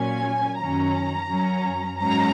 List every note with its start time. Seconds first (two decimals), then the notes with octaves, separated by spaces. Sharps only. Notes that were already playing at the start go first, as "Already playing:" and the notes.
Already playing: A#2 F#3 C#4 G#5
0.58 F#2 D#3 F#3 C#4 A#5
1.28 F#2 F#3 C#4
1.98 G#2 F#3 C#4 A#5